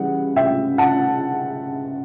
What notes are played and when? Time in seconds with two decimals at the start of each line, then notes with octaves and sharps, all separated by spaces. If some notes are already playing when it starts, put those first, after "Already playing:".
Already playing: C#3 E3 G3 F#5
0.36 E5 G5
0.78 F#5 A5